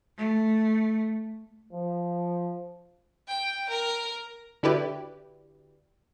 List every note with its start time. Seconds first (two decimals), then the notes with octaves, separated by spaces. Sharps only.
0.17 A3
1.73 F3
3.27 G5
3.69 A#4
4.63 D3 E4 F#4 G4 B4 D5